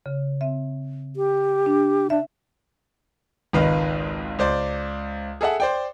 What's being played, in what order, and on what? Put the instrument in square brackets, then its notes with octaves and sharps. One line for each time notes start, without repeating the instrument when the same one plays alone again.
[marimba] C#3
C4 E5
[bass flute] G4
[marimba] D4
[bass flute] D4 [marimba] E5
[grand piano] G#1 C#2 D#3 B4 D#5 F5
C#2 C5 D5
G#4 A4 E5 F#5
C5 D5 G5